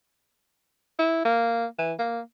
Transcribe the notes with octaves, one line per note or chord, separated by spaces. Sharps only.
E4
A#3
E3
A#3